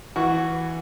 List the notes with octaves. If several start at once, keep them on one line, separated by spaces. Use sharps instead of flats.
E3 F#4